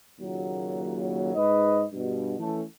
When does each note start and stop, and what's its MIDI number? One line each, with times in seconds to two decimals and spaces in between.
0.19 1.34 39
0.19 1.34 46
0.19 1.34 49
0.19 1.34 54
1.35 1.84 44
1.35 1.84 71
1.35 1.84 75
1.93 2.35 43
1.93 2.35 47
2.39 2.63 52
2.39 2.63 57
2.39 2.63 61
2.39 2.63 69